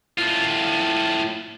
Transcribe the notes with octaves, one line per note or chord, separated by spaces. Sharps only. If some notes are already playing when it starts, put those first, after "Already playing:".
A2 F4